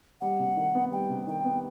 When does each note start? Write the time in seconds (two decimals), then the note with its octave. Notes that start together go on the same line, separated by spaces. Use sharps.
0.21 G3 F#5
0.39 C3
0.56 D#3
0.75 B3
0.92 G3 G5
1.10 C3
1.27 D#3 G5
1.45 B3